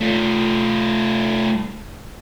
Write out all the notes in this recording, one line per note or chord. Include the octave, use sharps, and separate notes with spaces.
A3 F4